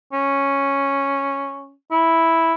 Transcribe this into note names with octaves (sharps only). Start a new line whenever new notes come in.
C#4
E4